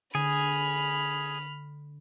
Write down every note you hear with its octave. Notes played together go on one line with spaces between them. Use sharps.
D3 G#4 B5 F6